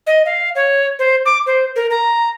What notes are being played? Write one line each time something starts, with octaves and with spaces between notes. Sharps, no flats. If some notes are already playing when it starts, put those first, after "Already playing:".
D#5
F5
C#5
C5
D6
C5
A#4
A#5